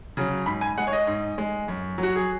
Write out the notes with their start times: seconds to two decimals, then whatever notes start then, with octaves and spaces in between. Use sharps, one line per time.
0.17 C#3 F#3
0.46 G#2 B5
0.61 G#5
0.78 G#3 F#5
0.87 C#5
0.93 D#5
1.07 G#2
1.38 G#3
1.68 F#2
1.98 F#3
2.03 F#4
2.16 G#4